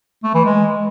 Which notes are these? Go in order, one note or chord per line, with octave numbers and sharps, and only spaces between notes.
A3
E3
G#3